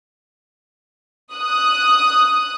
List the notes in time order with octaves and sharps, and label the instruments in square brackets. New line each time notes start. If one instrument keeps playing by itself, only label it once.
[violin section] D#6 F#6